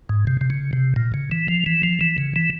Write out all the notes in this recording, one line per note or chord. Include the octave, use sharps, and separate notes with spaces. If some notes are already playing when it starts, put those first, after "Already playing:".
G#2
C3
C3
C#3
C3
A#2
C#3
E3
F3
E3
F3
E3
C#3
E3